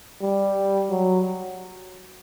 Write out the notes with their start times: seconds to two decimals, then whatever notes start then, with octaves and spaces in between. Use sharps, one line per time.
0.22 G3
0.90 F#3